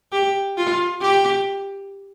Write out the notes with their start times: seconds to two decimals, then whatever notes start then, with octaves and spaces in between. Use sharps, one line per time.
0.12 G4
0.57 F4
1.01 G4